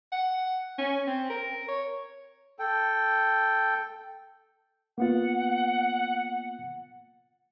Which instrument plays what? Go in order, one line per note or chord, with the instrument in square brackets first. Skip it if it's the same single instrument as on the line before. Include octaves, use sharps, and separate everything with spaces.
[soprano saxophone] F#5
C#4
C4
A#4
C#5
[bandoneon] A4 G5
[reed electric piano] A#3 B3 F4 [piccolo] F#5